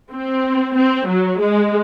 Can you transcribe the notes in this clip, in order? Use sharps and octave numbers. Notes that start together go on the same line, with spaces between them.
C4
C4
F#3
G#3